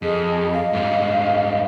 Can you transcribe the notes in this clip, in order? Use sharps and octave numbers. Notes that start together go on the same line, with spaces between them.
F2 G#4 D#5
F5
G#2 G3